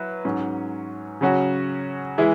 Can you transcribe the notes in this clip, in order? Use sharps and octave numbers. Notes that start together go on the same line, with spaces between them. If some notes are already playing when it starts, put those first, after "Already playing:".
Already playing: F#3 E4 B4
G#2 F#3 C#4
C#3 F#3 C#4 F#4
E3 G#3 E4